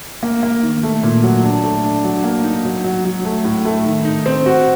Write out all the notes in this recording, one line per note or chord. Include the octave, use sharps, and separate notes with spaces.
A#3
A#3
D#3
A3
A#2
F#3
D4
A3
D4
F#3
A#3
D#4
F#3
F#3
F#3
A3
A2
A3
D#3
D#4
C4
F#4